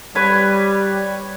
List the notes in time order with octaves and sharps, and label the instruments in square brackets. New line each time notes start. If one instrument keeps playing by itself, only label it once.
[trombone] G3 [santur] B4 C#5